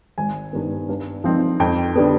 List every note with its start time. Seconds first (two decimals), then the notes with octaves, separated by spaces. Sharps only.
0.18 G#1 G#5
0.53 G2 D#3 B3
0.89 G2
1.24 F3 C4 D#4
1.60 F2 G5
1.95 D3 G3 B3